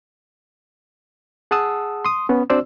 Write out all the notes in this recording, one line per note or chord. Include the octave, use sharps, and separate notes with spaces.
G#4 F#5 A5 D#6 E6
C6 D#6
B3 C#4
C4 D4 F#4 C5 D5 E6